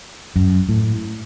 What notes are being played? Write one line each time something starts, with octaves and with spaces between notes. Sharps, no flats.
F#2
A2